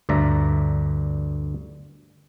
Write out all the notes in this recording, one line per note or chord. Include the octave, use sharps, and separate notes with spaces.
D2 G2 D5 E5 A#5